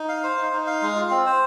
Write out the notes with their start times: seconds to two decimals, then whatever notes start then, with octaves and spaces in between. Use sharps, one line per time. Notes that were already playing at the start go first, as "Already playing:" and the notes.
Already playing: D#4
0.09 F5
0.23 C5
0.38 D#4
0.53 D#4
0.67 F5
0.82 G#3
0.96 F4
1.10 C4
1.26 C5